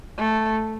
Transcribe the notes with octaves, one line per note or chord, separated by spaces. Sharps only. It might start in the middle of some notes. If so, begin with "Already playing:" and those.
A3